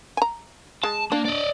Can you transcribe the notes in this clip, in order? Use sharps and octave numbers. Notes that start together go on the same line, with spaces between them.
G#5 A#5
G#3 A5
A#3 D4
D5 D#5